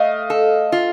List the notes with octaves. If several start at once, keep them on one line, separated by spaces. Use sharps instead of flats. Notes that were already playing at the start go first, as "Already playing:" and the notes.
Already playing: A3 D#5 F5
A4
F4